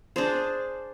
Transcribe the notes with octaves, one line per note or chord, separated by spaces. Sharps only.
D4 G#4 C5